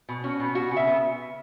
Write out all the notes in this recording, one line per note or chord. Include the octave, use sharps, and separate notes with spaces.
B2
C#4 F#4
B2
B3 F#4
C#3
E5
B3